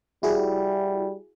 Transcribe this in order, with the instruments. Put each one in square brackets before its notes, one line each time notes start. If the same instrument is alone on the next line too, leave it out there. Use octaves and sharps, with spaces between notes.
[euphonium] G3 [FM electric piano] E4 F#4 G#4